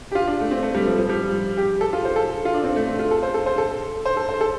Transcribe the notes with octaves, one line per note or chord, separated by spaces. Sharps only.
G4
F4
D4
A3
C4
A3
G3
F3
F3
G3
G4
A4
F4
C5
A4
F4
D4
C4
A3
C4
F4
A4
C5
A4
C5
A4
C5
A4
C5
A4